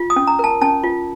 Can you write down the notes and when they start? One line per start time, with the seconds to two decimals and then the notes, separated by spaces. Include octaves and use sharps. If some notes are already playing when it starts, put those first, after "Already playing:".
Already playing: F4
0.10 D#6
0.16 C#4
0.27 A#5
0.39 A#4 A5
0.62 C#4 A5
0.83 F4